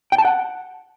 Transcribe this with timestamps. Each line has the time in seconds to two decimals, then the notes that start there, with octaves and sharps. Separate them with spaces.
0.12 G5
0.18 A5
0.25 F#5